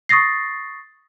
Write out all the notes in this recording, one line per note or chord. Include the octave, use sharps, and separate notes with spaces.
C#6 D#6 A6 A#6 C7